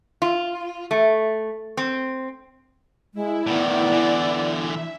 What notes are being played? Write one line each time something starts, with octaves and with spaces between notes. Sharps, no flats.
F4
A3
C4
G#3 E4
A2 D#3 B3 D5
D3 E3
E5